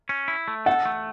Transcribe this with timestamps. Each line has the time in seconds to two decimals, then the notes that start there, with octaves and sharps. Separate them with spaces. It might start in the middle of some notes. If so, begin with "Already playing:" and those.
0.09 C#4
0.28 E4
0.48 A3
0.66 A4 F#5
0.86 A3